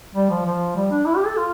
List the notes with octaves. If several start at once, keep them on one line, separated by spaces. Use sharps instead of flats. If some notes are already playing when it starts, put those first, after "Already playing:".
G3
F3
F3
G3
D4
E4
G4
A4
F4